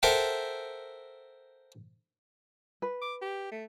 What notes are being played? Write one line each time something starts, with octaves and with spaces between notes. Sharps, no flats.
A4 A#4 C5 E5 F#5 G5
B4
D6
G4
A3